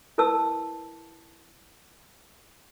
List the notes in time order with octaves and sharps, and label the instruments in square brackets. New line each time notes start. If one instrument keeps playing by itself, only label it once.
[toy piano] E4 A#4 B4 A5 E6